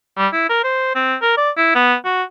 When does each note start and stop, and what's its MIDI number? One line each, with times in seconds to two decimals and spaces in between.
0.18 0.28 55
0.33 0.47 64
0.49 0.62 70
0.64 0.92 72
0.95 1.16 60
1.22 1.34 70
1.37 1.50 74
1.57 1.71 64
1.75 1.95 59
2.05 2.23 66